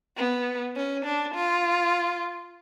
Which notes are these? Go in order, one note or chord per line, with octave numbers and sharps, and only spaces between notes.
B3
C#4
D4
F4